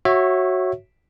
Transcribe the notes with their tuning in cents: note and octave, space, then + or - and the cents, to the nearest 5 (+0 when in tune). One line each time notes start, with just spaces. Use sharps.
F#4 +0 C#5 -20 E5 +0